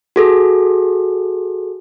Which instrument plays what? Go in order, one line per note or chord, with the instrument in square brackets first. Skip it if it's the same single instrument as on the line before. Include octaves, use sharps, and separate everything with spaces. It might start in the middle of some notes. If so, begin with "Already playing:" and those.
[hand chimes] F#4 G#4 A4